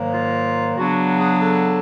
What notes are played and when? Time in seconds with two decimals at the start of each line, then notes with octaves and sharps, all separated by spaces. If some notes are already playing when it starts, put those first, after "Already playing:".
Already playing: G#2 D#3 F#3 A#3
0.14 F4
0.77 C#3 F#3 B3 D4 F#4
1.19 G#4
1.40 A4